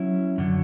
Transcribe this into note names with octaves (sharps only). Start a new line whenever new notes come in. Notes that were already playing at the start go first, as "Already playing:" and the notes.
Already playing: F#3 C#4 E4
F#2 D3 F#3